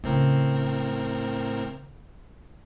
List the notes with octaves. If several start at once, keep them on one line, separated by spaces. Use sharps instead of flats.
A2 C#3 C4 A#4